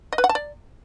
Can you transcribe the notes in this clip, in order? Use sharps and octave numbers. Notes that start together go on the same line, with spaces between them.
D#5
B4
F#5
A5
D5